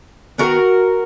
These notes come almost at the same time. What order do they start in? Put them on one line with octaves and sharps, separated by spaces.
G#3 B3 F#4 A#4 D#3